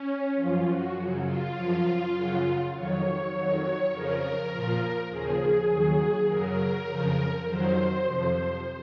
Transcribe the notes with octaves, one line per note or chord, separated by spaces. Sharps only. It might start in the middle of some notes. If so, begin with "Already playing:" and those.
Already playing: C#4
F#2 F3 F4
F#4
F#2 C#3 F#3
F4
F#2 F3
F#2 C#3 F#3
F2 D#3 F#3 C#5
F2 D#3 F#3
F2 C#3 F3 A#4
A#2 F3
D#2 C#3 F3 G#4
D#2 D#3 F#3
F#2 C#3 F#3 A#4
F2 C#3 F3
F2 D#3 F#3 C5
F2 C3 F3